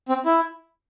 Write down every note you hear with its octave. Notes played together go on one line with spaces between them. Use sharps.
C4
E4